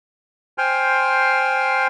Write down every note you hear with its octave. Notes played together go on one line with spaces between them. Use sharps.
C5 G5 G#5 C6 F6